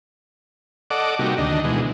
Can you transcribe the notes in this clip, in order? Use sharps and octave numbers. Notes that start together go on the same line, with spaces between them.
A4 D5 D#5 F#5 D6
C3 G3 A#3 D#4 F#4
D2 D#3 D4 D#5
B2 E3 G#3